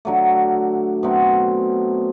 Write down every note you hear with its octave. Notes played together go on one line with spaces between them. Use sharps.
D3 F#3 A3
B2 F#3 A3 C4